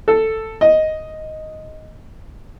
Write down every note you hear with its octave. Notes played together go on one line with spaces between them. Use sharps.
A4
D#5